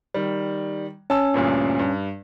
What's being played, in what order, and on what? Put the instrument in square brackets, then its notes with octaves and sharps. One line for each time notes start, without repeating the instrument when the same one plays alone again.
[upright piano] D#3 G3
[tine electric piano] C#4 [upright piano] A5 E6
[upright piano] D2 G2 A#2
G2